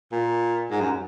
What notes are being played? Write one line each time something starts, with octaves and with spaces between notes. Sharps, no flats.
A#2
G#2
F#2